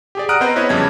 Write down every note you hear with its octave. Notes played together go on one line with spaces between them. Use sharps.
G4 G#4 D5
F#5 A#5 D#6 F6 F#6 D7
B3 C4 B4 C5 D#5 A#5
B3 E4 B4 C#5 D#5
F2 C#3 G3 G#6